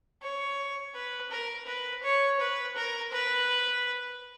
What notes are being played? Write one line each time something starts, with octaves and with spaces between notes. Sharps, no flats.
C#5
B4
A#4
B4
C#5
B4
A#4
B4